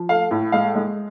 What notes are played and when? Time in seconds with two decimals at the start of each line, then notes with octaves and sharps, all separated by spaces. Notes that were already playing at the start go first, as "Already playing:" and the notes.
Already playing: F3
0.09 A3 F5
0.31 A2
0.52 G#3 F5
0.75 G#3